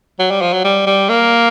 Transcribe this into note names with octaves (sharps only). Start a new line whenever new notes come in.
F#3
G3
F3
F#3
G3
G3
A#3